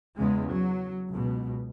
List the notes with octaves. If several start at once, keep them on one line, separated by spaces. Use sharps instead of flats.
E2 C#3 G#3
F#3
C#2 B2